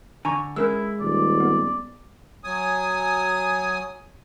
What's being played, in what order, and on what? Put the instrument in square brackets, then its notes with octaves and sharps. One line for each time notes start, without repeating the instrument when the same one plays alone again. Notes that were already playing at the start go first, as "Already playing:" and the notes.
[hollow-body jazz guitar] D3 [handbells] G#5 A#5 C#6
[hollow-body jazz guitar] G#3 [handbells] C#4 A#4 E6 [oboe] E4
[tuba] D#1 [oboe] D5
[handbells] B3
[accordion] F#3 G#5 D#6